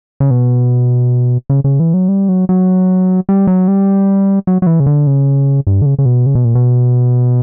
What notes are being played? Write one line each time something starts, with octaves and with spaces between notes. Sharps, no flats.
C#3
B2
C#3
C#3
E3
F#3
G3
F#3
F#3
G3
F#3
G3
F#3
F#3
E3
C#3
D3
C#3
G2
D3
C#3
C#3
B2
C#3
B2
A#2
B2